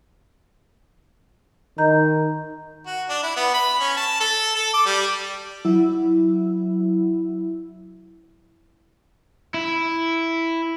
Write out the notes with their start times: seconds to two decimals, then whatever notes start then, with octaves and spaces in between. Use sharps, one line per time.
1.78 D#3 D#5 A#5 G6
2.86 F#4
3.09 D4
3.23 E4
3.37 B3
3.54 B5
3.80 C#4
3.97 A5
4.20 A4
4.56 A4
4.74 D6
4.86 G3
5.65 F#3 E4
9.54 E4